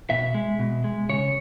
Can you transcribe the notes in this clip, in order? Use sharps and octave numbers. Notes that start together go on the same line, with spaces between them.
B2 E5
G#3
B2
G#3
C#3 C#5